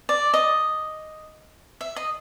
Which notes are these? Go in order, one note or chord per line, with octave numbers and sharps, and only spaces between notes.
D5
D#5
E5
D#5